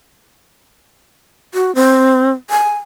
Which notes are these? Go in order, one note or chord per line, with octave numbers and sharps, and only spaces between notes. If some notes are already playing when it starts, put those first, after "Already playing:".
F#4
C4
G#5